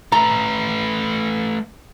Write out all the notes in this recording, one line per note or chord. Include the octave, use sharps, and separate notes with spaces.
A3 B4 A#5